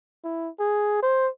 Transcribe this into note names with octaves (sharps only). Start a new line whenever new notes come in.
E4
G#4
C5